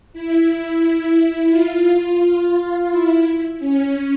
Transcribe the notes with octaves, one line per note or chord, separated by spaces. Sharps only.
E4
F4
E4
C#4